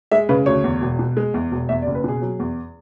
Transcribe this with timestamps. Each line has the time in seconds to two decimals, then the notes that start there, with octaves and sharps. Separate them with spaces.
0.11 G#3 E5
0.29 C#3 B4
0.46 D2 C#5
0.64 E2
0.81 E1
0.99 B2
1.17 G#3
1.34 E2
1.52 E1
1.69 E2 E5
1.82 D5
1.87 F#1
1.95 B4
2.04 B2 G#4
2.22 F#3
2.39 E2